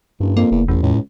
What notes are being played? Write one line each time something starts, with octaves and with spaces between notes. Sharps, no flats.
F#1 G2
F2 A#3
F1 E2
A1 E2
C#2 A2